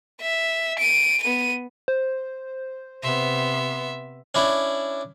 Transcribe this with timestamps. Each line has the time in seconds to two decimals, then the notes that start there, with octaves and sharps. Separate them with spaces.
0.21 E5
0.79 D7 D#7
1.23 B3 D#7
1.88 C5
3.03 C3 B3 E5 C6
4.35 C#4 D4 E4